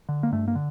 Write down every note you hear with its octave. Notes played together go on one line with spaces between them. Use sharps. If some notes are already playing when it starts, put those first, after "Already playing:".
D3
A#3
G2 A3
A#3
D3